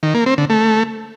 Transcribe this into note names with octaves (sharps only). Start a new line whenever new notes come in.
D#3
A#3
C4
D3
A3